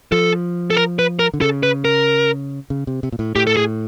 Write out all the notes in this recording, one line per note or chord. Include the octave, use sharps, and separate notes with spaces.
F3 A4
A4
A#4
B4
A#4
D3
C#3 A4
B4
A#4
C#3
C3
C3
A#2
A2
A2 G4
A4
G#4